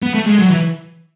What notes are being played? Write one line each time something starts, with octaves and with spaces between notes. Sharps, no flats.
B3
A3
G#3
F#3
E3